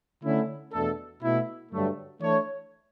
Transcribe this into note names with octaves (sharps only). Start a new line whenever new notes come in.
D3 A3 C#4 E4
E2 B2 A3 D4 A4
B2 A3 E4
G2 D3 F#3 A3
E3 A3 D4 A4 C#5